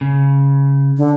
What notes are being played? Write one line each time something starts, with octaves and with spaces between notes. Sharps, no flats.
C#3
D3